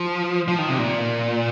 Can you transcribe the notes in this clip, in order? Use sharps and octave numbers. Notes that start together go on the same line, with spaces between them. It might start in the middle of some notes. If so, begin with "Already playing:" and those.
Already playing: F3
F3
D#3
C3
A#2